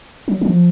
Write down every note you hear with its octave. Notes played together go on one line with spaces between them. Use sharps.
F#3
F#3
F3